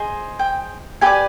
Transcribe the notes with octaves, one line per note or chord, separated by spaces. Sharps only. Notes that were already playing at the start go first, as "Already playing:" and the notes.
Already playing: G#4 C5 D#5
G5
G4 B4 D5 G#5